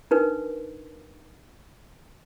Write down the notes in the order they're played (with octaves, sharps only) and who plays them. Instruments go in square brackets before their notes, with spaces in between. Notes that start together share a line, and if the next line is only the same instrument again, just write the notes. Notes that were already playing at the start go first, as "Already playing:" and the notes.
[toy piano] D4 D#4 A#4 B4